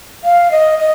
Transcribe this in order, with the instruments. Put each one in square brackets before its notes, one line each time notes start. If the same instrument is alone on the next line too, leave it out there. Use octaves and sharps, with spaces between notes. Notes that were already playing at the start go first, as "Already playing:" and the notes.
[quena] F5
D#5
D#5